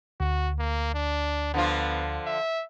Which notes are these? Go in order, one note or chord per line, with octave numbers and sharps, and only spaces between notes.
D2 F#4
A#3
D4
D3 F3 B3 F4
E5